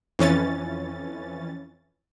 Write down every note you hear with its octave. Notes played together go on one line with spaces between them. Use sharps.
F2 E3 C#4 A6